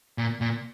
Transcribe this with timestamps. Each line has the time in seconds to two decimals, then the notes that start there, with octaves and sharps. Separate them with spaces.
0.18 A#2
0.41 A#2